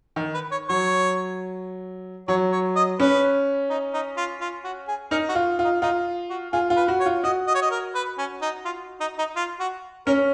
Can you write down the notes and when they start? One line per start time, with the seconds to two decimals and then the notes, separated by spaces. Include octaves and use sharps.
0.16 D#3
0.34 B4
0.51 C#5
0.69 F#3 C#5
2.28 F#3 C#5
2.52 C#5
2.76 D#5
2.99 C#4 B4
3.70 D#4
3.94 D#4
4.17 F4
4.41 F4
4.64 F#4
4.88 G#4
5.11 D#4 A#4
5.29 F#4
5.35 F4
5.59 F4
5.64 D#4
5.82 D#4 F4
6.30 F#4
6.53 F4 G#4
6.70 F4
6.76 B4
6.88 F#4
7.00 C#5
7.06 F4
7.24 F#4 D#5
7.47 D#5
7.55 C#5
7.62 D#5
7.71 A#4
7.95 B4
8.18 C#4
8.42 D#4
8.65 F4
9.01 D#4
9.18 D#4
9.36 F4
9.60 F#4
10.07 C#4 A#4